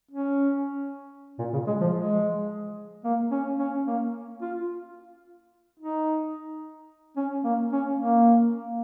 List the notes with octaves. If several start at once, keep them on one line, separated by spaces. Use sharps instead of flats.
C#4
A#2
C#3
G#3
F3
G#3
A#3
C#4
C#4
A#3
F4
D#4
C#4
A#3
C#4
A#3